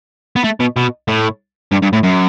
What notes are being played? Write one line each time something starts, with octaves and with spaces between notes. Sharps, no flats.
B3
A3
B2
B2
A2
G2
G2
A2
F#2